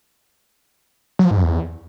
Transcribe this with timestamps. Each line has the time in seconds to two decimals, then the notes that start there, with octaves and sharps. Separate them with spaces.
1.19 F#3
1.25 F3
1.31 G#2
1.37 F#2
1.43 E2